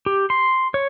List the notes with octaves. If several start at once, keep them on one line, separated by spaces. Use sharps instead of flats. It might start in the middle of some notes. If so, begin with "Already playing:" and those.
G4
C6
C#5